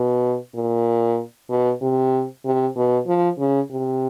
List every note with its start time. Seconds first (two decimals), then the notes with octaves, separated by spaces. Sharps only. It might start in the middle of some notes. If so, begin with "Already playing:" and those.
Already playing: B2
0.55 A#2
1.50 B2
1.81 C3
2.45 C3
2.76 B2
3.07 F3
3.39 C#3
3.71 C3